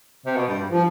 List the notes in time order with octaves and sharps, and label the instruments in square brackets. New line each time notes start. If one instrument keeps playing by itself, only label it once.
[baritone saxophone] C3
B2
G2
G2
[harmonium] F3